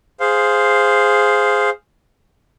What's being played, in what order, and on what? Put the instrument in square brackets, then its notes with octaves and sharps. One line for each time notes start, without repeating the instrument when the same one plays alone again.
[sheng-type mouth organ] G#4 C5 F5